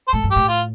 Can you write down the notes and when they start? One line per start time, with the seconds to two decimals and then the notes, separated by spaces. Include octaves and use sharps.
0.08 C5
0.13 A2 A4
0.24 G2
0.31 G4
0.36 A2
0.48 F4